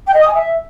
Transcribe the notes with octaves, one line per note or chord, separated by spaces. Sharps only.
G5
D#5
D#6
G#5
E5